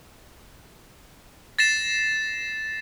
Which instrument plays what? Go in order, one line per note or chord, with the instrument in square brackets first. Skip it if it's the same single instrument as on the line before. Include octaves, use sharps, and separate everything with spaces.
[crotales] A6 A#6 C7 E7